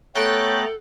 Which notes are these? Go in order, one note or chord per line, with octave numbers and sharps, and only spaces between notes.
A3 B3 A4 C#5 G5 A#5 F#6 A6